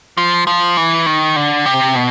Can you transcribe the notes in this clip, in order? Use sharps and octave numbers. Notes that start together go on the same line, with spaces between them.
F3
F3
E3
D#3
D3
C3
B2